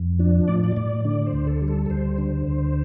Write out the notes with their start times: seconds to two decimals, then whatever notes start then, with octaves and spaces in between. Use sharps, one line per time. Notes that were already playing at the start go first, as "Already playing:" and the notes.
Already playing: F2
0.19 F3 D4
0.48 A2 D5
0.64 D5
0.76 A2 D5
1.04 D3 D5
1.26 C5
1.33 D2
1.47 A4
1.61 G3
1.68 A4
1.86 A4
1.90 D2 C5
2.18 D3
2.47 D2